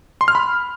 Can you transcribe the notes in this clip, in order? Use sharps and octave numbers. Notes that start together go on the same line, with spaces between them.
C6
F6
B5